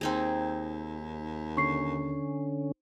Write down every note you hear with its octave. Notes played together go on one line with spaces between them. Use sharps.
D#2 C4 D#4 G#4
D3 C#4 C#6 C7